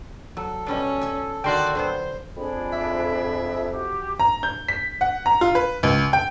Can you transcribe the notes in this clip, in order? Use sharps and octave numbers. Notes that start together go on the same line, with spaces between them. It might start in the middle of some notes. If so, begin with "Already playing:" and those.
F#3 A4
B2 G3 C#4 D4
E5 G#5
D3 D#3 F#4 D5 F#5 G5 C6 F#6
D3 F#3 B3 C5
F2 D4 G#4 B5
E5
F#4 G4
A#5
G6
B6
F#5
A#5
F4
B4
C#2
G5